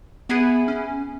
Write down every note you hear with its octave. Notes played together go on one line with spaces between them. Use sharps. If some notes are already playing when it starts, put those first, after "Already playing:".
B3 E4 G#4 B4
C#4